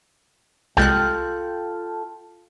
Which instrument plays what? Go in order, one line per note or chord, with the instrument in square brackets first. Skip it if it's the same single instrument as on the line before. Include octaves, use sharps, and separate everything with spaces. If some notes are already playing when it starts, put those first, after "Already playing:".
[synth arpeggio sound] C2 G#3 F#6 [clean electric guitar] F4 A4 G5